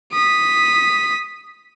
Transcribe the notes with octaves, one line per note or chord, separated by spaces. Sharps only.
D#6 B6